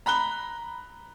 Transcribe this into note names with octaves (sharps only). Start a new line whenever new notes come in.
A#5 B5 F#6 G7